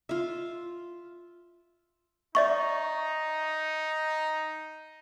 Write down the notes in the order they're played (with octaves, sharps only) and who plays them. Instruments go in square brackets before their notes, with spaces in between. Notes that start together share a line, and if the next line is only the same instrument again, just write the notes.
[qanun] F4 E5
[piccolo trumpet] D#4 [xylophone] D5 E5 C#6